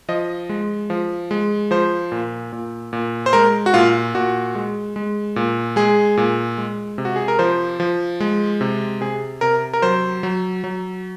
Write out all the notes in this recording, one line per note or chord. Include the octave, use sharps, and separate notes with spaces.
F3 D#5
G#3
F3
G#3
F3 C5
A#2
A#2
A#2
C5
G#3 A#4
F#4
A#2 F4
A#2 F#4
G#3
G#3
A#2
G#3 G#4
A#2
G#3
C3
F#4
G#4
A#4
F3 C5
F3
G#3
C3
C3 G#4
C3 A#4
A#4
F#3 C5
F#3
F#3